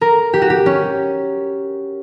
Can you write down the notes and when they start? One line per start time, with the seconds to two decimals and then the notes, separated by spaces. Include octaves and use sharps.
0.01 A#4
0.34 G4
0.42 F#4
0.50 G4
0.66 C#4